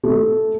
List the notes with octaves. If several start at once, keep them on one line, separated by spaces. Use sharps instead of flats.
A3